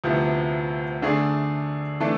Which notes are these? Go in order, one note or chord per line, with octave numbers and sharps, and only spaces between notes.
D2 C3 F3 B3 E4
D3 A3 D4 G#4
E3 A3 D4 A4